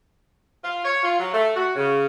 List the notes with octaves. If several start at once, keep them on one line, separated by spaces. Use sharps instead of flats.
F4
C#5
F4
F#3
A3
F#4
C#3